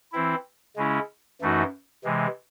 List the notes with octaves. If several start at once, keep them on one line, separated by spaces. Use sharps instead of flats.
E3 C4 E4
C#3 G#3 C#4 E4
F#2 E3 A3 D#4 F#4
C3 E3 G#3